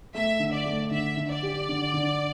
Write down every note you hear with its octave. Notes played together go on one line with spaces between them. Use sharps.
A3 E5
D3
D5
A3
D3 E5
D3
D5
G4
D3
D3